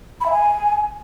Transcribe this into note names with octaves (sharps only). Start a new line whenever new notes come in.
B5
E5
G#5